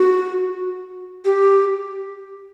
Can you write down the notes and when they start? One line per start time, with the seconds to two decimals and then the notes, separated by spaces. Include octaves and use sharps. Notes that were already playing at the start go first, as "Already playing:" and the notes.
Already playing: F#4
1.25 G4